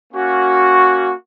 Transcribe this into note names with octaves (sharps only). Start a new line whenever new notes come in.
A#3 C#4 F#4